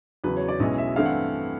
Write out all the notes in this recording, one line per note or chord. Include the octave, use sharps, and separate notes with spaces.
E2 C#3 F#3 B4
C#5
D5
B1 B2 G#3 C#4 E4 D#5
E5
G2 E3 A3 C4 E4 F5
F#5